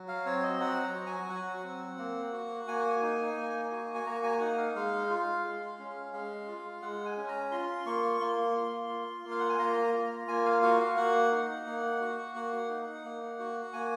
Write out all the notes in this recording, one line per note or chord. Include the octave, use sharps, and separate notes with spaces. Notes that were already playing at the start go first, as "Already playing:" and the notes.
Already playing: F#3
F5
C4 C#5
D#5
F#3 F#5
A#5
F#4
G#5
F#3 F#5
C4
A#3
F#4
A#3 G#5
D#4
A#3
F#4
G#5
A#3 A#5
G#5
D#4 F#5
F5
G#3 F5
F4
G#3
C#4
G#3 F5
F4
G#3 F#5
G#5
C#4
A#5
F4 C6
A#3 C#6
A#3 C6
F4
F4
A#3
F5
F#5
G#5
A#3 A#5
F4
A#3 G#5
F5
F#4 F5
F5
A#3 F#5
D#4
A#3
F#4
A#3 F#5
D#4
A#3
F#4
A#3 G#5